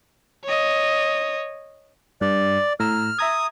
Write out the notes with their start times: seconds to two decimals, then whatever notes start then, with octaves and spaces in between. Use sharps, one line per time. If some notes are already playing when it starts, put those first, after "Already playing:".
0.44 C#5 D#5
2.21 G2 D5
2.80 A2 A#5 E6 F6
3.19 E5 A#5 D#6 G#6